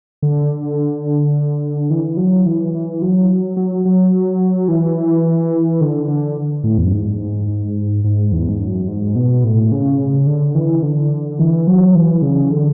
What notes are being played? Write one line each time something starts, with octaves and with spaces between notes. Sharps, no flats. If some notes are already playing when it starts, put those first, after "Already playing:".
D3
E3
F#3
E3
E3
F#3
F#3
F#3
E3
D3
D3
A2
E2
F#2
G#2
G#2
E2
G#2
F#2
G#2
B2
A2
C#3
D3
E3
D3
E3
F#3
E3
C#3
D3